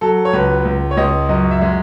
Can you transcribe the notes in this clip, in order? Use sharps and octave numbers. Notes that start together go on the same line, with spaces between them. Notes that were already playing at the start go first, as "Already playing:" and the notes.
F#3 A4
C#5
C#2 B4
C#2
C#5
C#2 D#5
F#2 D#5
E5
G#3